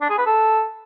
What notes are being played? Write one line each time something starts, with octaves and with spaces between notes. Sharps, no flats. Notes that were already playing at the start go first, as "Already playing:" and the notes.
D4
G#4
B4
A4